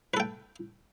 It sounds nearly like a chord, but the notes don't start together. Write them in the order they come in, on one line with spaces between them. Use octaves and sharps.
B4 A4 G5